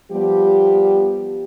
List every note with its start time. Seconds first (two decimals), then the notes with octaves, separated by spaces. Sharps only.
0.11 F3 G3 B3 G4